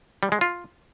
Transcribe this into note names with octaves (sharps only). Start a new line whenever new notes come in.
G3
G#3
F4